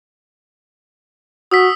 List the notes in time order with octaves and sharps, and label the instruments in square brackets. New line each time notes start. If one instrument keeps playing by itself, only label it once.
[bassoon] F#4 [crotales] D#6 E6 B6